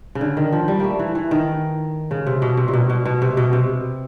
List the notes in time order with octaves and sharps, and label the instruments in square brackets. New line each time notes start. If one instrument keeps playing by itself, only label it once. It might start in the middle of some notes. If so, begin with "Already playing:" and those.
[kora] C#3
D3
D#3
F3
G3
A3 A#3
E3
E3
D#3
C#3
C3
B2
C3
A#2
B2
B2
B2
C3
B2
C3